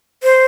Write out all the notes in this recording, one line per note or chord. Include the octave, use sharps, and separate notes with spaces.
C5